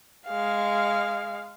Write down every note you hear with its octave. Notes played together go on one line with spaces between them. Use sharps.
G#3 F5